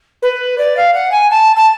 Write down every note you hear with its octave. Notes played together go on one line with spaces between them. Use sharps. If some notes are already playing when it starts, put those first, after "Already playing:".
B4
D5
F5
F#5
G#5
A5
A5